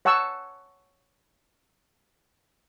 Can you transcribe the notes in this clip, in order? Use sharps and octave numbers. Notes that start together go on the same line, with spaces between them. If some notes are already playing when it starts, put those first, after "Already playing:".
C#5 F#5 A5 C#6 E6